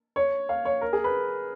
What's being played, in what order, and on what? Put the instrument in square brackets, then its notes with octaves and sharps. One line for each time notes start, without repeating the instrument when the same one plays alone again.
[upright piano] C#5
F5
C#5
A#4
G#4
B4